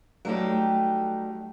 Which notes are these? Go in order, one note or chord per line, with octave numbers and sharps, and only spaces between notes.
F#3 G3 A3 D#4 G4